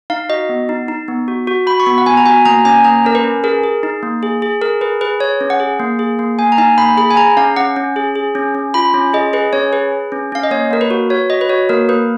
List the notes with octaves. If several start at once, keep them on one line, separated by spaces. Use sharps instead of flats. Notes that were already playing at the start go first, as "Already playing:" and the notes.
D#4 F5
F#4 D#5
B3
D#4
D#4
B3
F#4
F#4
F#4 B5
C#6
B3 B5
F#5
B3 G#5
A#5
F#4 G#5
A#3 A#5
C#4 G#5
A#3 A#5
C#4 A#4
B4
C#4
G#4 A#4
G#4
D#4
A#3
G#4
G#4
G#4 A#4
G#4 B4
G#4 B4
G#4 C#5
C#4
F#5
G#4
A#3
G#4
A#3
A#3 G#5
A#5
D#4 G#5
A#3 B5
G#4 B5
G#5
G#4 A#5
C#4 F5
C#4 F#5
C#4
G#4
G#4
C#4
C#4
F4 B5
C#4
G#4 D#5
G#4 B4
C#4 C#5
G#4 B4
G#4
C#4
C#4 F5
D#5
A#3 C#5
A#3 A#4
B4
F#4
F#4 C#5
F#4 D#5
B4
F#4 C#5
A#3 A#4
A#3 B4